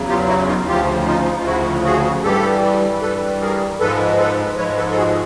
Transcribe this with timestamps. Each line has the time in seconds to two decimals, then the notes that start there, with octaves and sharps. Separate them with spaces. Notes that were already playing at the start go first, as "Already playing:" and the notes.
Already playing: E2 C#3 F#3
0.09 F4 G4
0.28 E4 F#4
0.48 D#4 F4
0.68 D2 C#3 F3 F4 G4
1.07 D#4 F4
1.39 F4
1.46 D2 C#3 F3 E4 F#4
1.85 F#4 G#4
2.24 G2 E3 G3 G4 A4
3.02 G2 E3 G3 A4 B4
3.41 G#4 A#4
3.80 G#2 F3 G#3 A4 B4
4.19 A4 B4
4.58 G#2 F3 G#3 B4 C#5
4.78 A4 B4
4.91 A4
4.97 F#4 G#4